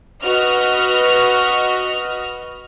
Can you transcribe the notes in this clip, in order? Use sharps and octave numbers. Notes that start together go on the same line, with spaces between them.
F#4 B4 D#5 F6